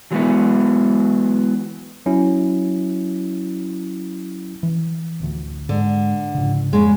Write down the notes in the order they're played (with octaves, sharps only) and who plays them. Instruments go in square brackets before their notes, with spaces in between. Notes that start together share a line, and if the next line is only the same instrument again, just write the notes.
[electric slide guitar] E3 F#3 G#3 A3 B3 E4
[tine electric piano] F#3 C#4 E4
[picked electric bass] E3
A1 D2
[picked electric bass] G#2 G#3 [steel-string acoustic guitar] D3
[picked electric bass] G#2 C#3
[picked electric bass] F2 A#3 [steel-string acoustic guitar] C#3 G#3